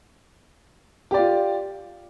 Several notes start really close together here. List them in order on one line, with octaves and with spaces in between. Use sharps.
G4 D5 F4